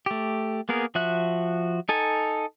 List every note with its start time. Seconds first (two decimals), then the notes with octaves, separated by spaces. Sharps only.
0.06 A3 G4
0.69 A#3 B3 G#4 A#4
0.95 F3 F#4 E5 F#6
1.89 D#4 A4 G#5